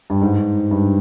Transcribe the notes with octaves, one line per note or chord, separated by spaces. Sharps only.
G2
G#2
G2